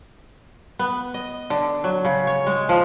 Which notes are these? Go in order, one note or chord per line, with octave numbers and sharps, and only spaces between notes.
B3
D#5
D3
F#3
C#3
C#5
G#3
F3